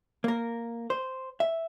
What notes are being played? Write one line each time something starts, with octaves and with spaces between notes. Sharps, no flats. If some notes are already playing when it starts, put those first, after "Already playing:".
A#3 A#4
C5
E5